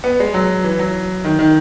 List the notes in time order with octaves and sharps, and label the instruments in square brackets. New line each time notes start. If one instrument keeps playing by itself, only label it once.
[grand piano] B3
G#3
F#3
E3
F#3
D#3
D#3